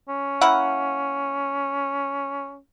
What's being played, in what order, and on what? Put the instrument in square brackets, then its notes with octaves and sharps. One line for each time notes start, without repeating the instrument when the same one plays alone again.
[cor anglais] C#4
[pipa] A#3 E4 F#5